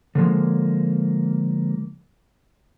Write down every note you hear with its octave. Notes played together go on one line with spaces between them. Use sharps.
D3 F3 G#3 A#3